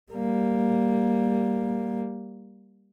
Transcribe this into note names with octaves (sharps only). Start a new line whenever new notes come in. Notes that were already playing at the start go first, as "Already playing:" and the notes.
G3 A#3